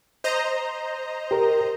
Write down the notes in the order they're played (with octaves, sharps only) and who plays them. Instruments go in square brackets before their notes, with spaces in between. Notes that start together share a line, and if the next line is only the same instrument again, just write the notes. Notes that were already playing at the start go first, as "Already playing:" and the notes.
[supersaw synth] C5 D#5 A#5
[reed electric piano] G4 A#4